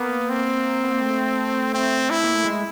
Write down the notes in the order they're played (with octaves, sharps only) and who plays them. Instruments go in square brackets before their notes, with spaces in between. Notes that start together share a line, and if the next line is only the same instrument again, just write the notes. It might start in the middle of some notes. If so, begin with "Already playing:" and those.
Already playing: [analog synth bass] A#3 [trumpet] B3
[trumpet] C4
[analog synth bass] B3
A#3
A3
[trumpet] C4
E4
[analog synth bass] A#3
A3
G#3